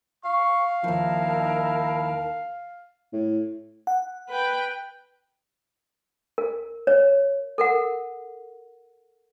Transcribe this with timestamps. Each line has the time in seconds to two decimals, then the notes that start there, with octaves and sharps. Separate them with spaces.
0.25 F5 C#6
0.84 D#2 F3 D#4 E4 A#4 A5
3.13 A2
3.87 F#5
4.29 B4 G5
6.38 A#4
6.87 C#5
7.58 A4 A#4 F#5